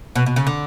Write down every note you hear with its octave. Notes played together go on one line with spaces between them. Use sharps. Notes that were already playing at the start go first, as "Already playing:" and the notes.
B2
B2
C#3
D3